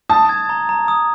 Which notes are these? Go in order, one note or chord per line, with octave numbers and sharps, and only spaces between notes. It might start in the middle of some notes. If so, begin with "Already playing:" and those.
A5 D#6
G#6
A#5
A#5
D#6